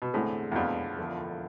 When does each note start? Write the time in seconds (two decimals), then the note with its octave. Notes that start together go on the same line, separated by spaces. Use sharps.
0.02 B2
0.14 E2 A2 D3 G#3 C4 G#4
0.52 E2
0.56 F2 B2 G#3 D4
0.99 E1 D2 D3 F3